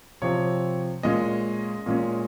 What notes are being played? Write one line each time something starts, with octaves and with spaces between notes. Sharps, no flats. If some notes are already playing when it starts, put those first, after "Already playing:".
C3 F3 C4 C#5
A#2 G#3 C#4 D#5
A#2 G#3 C#4